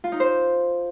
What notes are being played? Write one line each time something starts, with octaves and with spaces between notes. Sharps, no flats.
F4
D#4
C5